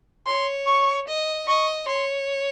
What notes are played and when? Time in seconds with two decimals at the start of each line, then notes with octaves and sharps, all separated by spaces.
0.26 C#5 C6
0.67 C#6
1.07 D#5
1.47 D#5 C#6
1.86 C#5 C6